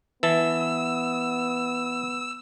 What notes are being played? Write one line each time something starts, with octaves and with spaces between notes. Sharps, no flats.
E3 B3 A5 E6